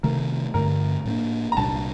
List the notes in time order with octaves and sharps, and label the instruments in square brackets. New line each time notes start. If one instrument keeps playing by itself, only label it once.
[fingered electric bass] C3 D#3 A3 [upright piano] A#4
[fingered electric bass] G2 D3 A3 [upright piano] A#4
[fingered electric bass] A2 G3 A#3 D4
[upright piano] A#5
[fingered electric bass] C2 A#2 G3 D4 [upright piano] A5